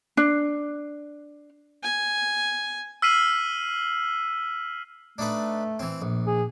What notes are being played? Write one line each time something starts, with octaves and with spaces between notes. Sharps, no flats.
D4
G#5
E6 F6 B6 C7 D#7 F#7
A3 D4 D#4 B4
E3 C4
A#1
G#4